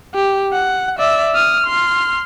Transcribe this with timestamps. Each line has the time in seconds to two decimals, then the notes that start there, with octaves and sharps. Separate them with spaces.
0.14 G4
0.53 F#5
0.98 D5 E5
1.35 D#6 F6
1.67 C6 F6